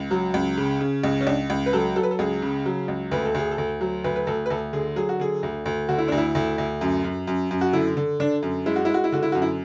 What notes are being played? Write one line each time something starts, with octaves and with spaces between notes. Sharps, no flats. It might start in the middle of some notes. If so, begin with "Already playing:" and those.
Already playing: C#2
F#3
C#2
C#3
C#3
C#2
C#4
C#2 D4
C#2
B4
F#3 A4
F#3 A4
B4
A4
C#2 G#4
C#3
F#3
C#2
D2 B4
A4
D2 G#4
A4
D2
F#3
D2 B4
B4
D2 A4
B4
D2 A4
D3 G#4
F#3 G#4
F#4
D3 G#4
D2
D2
D3 F#4
E4
D2 D4
E4
D2
D2
F#2
F#2
F#2
F#2
F#4
D3 E4
D3
D3 D4
F#2
G#3 E4
F#4
G#3 E4
F#4
E4
D3 F#4
E4
F#2 F#4
E4